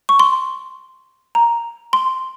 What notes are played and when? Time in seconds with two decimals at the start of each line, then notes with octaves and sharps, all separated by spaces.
0.09 C#6
0.19 C6
1.35 A#5
1.93 C6